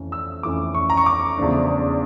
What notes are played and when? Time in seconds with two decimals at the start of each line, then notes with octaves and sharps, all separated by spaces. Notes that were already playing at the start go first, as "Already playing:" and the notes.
Already playing: F2 E3 A3 C#4
0.12 E6
0.43 F2 E3 A3 C#4 D6
0.74 C#6
0.90 A#5
0.97 C#6
1.06 D6
1.38 E2 C#3 F3 A3 D4